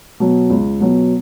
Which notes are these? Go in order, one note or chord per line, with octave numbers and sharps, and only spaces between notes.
B2 F#3 B3
C#2
B2 F#3 B3